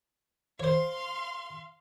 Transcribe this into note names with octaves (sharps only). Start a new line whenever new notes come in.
C5 C#5 F5 C6